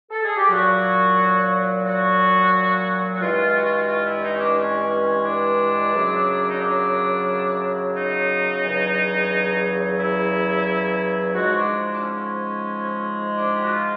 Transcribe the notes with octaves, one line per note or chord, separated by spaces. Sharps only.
A4
G#4
G4
A#2 F#3 F#4
F#4
F#4
G2 E3 G#3 F4
F#4
F4
F#4
F4
E4
D#4
C#4
D4
C#4
C#4
D4
F#2 C#3 F#3
D#4
D4
D#4
E2 C#3 F#3
E4
G#2 F3 G#3 F#4
D4
D4
C#4
D4
G4
F#4
F4